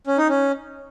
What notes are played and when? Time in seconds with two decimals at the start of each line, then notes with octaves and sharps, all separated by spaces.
0.07 C#4
0.18 D#4
0.29 C#4